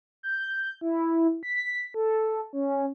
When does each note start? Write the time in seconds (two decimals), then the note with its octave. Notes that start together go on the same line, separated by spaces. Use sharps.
0.23 G6
0.81 E4
1.43 B6
1.94 A4
2.53 C#4